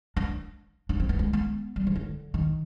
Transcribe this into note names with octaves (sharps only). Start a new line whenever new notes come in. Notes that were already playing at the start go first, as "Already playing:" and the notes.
D4
D4
C4
B3
G#3
B3
G3
F3
D3
D#3